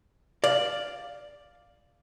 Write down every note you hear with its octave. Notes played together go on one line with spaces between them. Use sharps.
D5 F5